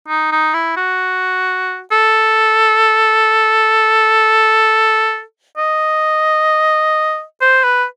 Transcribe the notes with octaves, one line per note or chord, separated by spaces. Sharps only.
D#4
D#4
E4
F#4
A4
D#5
C5
B4